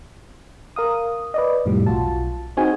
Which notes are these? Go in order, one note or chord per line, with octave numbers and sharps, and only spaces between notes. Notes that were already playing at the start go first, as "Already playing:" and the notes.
A#4 F5 D#6
B4 D5 D#5
F2 A2 C3 F3 G3
B1 F4 F#4 A5
C4 D#4 F#4 G#4 G#5